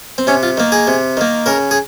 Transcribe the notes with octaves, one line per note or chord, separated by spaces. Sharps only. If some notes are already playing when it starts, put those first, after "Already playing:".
C4
C3 C#4
F4
D#3 A#3
G#4
C3
D#3 A#3
C#3 A#4
G#4